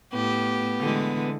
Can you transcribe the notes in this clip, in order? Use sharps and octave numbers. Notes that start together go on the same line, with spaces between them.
A2 B3 G4
D3 E3 G#3